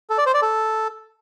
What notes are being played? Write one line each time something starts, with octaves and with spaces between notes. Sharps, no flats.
A4
D5
C5
D5
A4